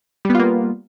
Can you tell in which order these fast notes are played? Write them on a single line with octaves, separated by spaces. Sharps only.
G3 B3 F4 A#3